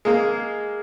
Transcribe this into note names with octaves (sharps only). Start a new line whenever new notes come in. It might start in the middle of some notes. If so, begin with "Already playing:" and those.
G#3 A#3